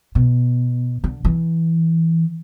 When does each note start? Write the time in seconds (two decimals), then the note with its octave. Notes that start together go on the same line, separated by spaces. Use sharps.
0.15 B2
1.04 D3
1.25 E3